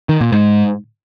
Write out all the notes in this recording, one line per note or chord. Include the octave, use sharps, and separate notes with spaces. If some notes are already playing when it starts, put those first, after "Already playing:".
D#3
A#2
G#2